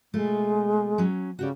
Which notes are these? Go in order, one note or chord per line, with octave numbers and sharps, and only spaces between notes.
B2 G#3 A3 F4
F#3 C#4
C#3 F#4 G4 D5